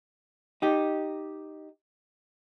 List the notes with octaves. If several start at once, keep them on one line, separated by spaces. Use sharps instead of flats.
D#4 G4